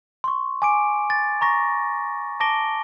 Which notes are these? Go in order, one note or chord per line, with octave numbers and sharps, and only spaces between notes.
C6 C#6
G#5 D6 D7
A6
A#5 C#6 A#6
A5 D6 A#6 D7 G7